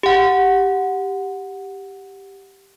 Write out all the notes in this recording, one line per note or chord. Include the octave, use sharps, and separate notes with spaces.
G4 F#5